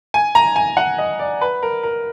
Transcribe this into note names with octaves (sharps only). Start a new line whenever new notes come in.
G#5
A#5
G#5
F#5
D#5
D5
B4
A#4
A#4